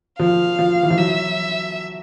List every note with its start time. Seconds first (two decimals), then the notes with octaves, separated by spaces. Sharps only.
0.19 F3 F5
0.59 F3
0.83 E3
0.90 F3
0.98 F#3 E5